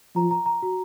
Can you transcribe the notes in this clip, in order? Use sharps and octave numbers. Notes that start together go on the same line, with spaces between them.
F3 A#5
A#5
A#5
F#4